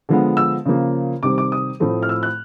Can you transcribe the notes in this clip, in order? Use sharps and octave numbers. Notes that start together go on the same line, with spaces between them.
D3 F3 G#3 B3
E6
C#3 F3 A#3
C3 D#3 G3 C4 D6
D6
D#6
A2 F3 A3 C4
F6
E6
F#6